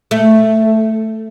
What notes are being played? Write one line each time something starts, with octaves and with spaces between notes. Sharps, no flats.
A3